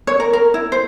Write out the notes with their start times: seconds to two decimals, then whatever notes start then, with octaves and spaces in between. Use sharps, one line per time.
0.07 C#5
0.20 A#4
0.33 A#4
0.54 E4
0.72 C5